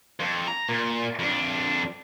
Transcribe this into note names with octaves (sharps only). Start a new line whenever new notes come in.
F2
A#5
A#2
F2 D4